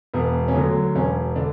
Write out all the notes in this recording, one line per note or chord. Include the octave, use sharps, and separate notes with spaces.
E1 B3
C#4
D2 D3 F#3 B3
E1 C#4
D3 D4